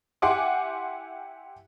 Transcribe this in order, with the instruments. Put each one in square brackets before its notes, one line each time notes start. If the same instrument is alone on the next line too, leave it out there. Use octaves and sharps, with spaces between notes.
[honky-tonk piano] E4 G4 F#5 G#5 C6 D6